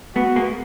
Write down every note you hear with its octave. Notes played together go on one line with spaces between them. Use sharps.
A3 B3 F#4
G#3 A#3